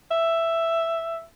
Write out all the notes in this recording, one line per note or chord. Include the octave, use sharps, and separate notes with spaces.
E5